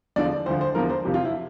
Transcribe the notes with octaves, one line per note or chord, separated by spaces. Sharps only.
E2 D3 F3 D5
D2 D3 F3 C5
C5
E2 D3 F3 A#4
C5
F2 C3 F3 G4
F4
E4